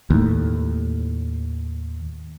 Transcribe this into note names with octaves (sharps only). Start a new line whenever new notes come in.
D#2 A2